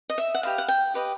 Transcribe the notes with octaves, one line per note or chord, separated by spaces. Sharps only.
D#5
E5
F#5
G4 B4 D#5 F5
F#5
G5
G4 B4 D#5